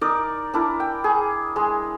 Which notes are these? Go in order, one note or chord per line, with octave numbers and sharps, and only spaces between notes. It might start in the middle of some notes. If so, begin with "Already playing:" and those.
D#4 A#4 D5
D4 E4 A#4
G5
G#4
G#3